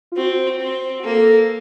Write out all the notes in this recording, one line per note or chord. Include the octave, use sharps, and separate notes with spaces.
F4
C4 F#4
C4
F#4
A#3 A4